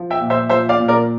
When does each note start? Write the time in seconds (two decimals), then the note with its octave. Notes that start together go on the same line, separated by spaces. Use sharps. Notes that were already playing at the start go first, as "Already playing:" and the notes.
Already playing: F3
0.11 E5 G5
0.20 A#2
0.30 C5 E5
0.49 F3 C5 E5
0.69 D5 F5
0.79 A#2
0.88 A#4 D5